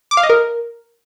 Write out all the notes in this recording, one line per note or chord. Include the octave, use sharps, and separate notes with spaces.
D6
F5
D#5
A#4